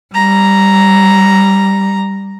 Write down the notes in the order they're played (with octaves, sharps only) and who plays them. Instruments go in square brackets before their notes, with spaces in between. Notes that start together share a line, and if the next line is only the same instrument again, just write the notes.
[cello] G3 [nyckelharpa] A#5